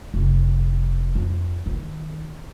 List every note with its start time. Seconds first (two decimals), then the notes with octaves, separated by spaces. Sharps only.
0.14 F1
1.15 F2
1.66 D#3